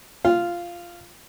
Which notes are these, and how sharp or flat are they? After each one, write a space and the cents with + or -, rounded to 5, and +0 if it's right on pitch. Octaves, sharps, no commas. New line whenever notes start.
F4 -10